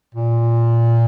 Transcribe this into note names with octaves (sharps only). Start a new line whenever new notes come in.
A#2